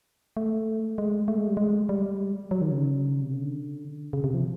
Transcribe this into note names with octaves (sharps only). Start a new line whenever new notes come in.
A3
G#3
A3
G#3
G3
G#3
G3
F#3
D#3
C#3
C3
C#3
D3
C#3
C3
F3